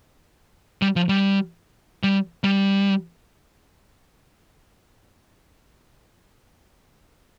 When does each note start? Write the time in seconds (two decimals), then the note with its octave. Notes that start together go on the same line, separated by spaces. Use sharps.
0.82 G3
0.96 F3
1.09 G3
2.03 G3
2.44 G3